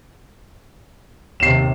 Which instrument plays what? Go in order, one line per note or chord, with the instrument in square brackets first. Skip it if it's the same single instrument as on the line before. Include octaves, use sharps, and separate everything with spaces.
[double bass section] D#2 C3 [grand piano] C7 E7